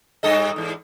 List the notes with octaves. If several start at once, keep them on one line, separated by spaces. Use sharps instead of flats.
G2 A4 D#5
E2 G#2